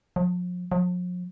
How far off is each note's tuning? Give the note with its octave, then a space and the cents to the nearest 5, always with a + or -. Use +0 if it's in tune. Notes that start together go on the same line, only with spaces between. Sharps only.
F3 +40
F3 +45